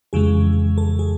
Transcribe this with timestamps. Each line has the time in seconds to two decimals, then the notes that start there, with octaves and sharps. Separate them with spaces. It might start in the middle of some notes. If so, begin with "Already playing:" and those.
0.13 F2 C#3 E3 G#3 G#4
0.78 A4
0.99 G#4